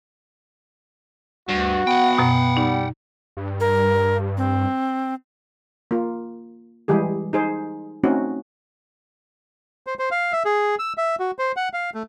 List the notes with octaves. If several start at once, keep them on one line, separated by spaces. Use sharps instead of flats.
D2 G2 F#4
B3 F#5 G5
F#2 B2
G3 D#4
G2
A#4
C4
A#3 F4
E3 G3 G#3 G4 G#4
D#4 G#4 C5
A3 C4 C#4 D#4 F#4
C5
C5
F5
E5
G#4
E6
E5
F#4
C5
F#5
F5
A3